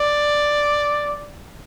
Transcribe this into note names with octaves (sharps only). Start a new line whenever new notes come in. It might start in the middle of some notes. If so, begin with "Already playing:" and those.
Already playing: D5